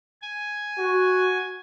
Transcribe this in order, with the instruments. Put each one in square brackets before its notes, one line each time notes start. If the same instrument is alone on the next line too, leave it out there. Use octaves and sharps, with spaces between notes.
[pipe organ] G#5
[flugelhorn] F#4